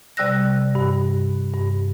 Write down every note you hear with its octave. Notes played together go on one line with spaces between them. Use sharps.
C3 G3 D5 E6 F#6 A#6
G2
G2